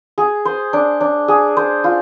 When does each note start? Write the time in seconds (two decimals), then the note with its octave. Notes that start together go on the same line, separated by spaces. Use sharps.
0.18 G#4
0.45 C5
0.73 D4
1.01 D4
1.28 G#4
1.57 C5
1.84 F4